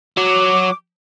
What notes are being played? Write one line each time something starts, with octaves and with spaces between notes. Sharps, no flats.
F#3 D6